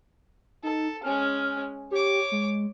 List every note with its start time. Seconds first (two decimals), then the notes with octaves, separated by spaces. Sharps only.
0.63 D#4 A4
1.03 G#3 C#4 F6
1.91 G4 C#5 D6
2.32 G#3